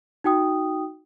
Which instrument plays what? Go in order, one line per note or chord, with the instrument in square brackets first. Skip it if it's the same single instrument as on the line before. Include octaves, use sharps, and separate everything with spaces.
[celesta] D#4 F#4 G5 D#6